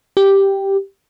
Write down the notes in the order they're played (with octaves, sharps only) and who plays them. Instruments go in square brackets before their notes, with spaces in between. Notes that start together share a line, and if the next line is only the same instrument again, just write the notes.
[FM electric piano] G4